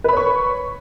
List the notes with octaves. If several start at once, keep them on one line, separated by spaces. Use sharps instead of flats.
B4 C#5 B5 C#6